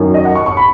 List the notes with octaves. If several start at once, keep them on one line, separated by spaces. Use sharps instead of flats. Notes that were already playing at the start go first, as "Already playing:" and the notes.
Already playing: F#2 D#3 F#3
D#5
F#5
C#6
C#6
B5